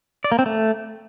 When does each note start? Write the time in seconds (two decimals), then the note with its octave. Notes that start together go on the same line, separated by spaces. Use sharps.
0.24 D5
0.32 A#3
0.39 C4
0.46 A3